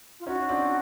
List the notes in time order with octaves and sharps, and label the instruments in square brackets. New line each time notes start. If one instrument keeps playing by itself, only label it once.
[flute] F4
[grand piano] C#4 D#4 [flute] F#4
[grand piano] C4 D4